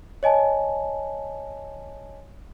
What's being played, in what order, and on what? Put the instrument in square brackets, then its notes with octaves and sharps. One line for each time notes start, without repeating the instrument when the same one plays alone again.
[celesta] C#5 D#5 G#5 A5